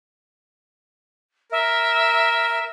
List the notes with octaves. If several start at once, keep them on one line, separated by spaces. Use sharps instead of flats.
A#4 E5